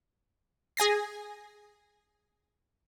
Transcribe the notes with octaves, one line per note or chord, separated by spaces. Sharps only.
G#4 G#5 A#6 C7